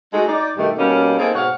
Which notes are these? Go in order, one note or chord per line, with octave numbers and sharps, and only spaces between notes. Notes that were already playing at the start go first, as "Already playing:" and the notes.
G#3 A3 D#4 F#4 G#4 A4
D#4 D5
G2 B2 D#3 A3
B2 G3 A#3 C#4 D#4 A4
A#3 C4 D#4 G#4 A4
G#2 B2 C#5 F5 F#5